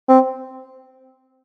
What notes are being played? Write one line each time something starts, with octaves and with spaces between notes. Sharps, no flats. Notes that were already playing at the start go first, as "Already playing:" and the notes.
C4